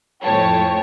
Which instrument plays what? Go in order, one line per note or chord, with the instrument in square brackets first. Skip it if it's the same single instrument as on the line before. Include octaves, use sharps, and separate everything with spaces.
[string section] F2 A2 C#5 [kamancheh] G5 A5